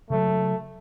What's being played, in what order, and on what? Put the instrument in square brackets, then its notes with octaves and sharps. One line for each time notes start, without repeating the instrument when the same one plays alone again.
[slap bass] C#3 F#3 [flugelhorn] A3